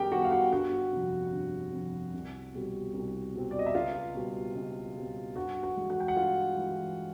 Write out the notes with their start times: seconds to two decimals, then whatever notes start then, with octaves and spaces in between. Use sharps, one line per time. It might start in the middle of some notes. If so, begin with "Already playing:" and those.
Already playing: F#2 D#3 G3 B3 G4 G#4 A#4 G5
0.12 D#3 G3 B3 F#4 F#5
0.25 F5
0.31 F#4 F#5
0.53 G1 F#4 F#5
0.93 F2 C3
1.32 G1
1.73 F2 C3
2.14 C2
2.54 B2 G3 C4
2.94 C2
3.35 B2 G3 C4
3.51 D5
3.59 D#5
3.66 E5
3.75 C#2 F4 F5
4.15 B2 G3 C4
4.55 C#2
4.96 B2 G3 C4
5.36 G2 F#4 F#5
5.63 F#4 F#5
5.77 E3 G#3
5.90 F#4 F#5
6.00 G5
6.08 F#5
6.16 G2 F4 F5
6.57 E3 G#3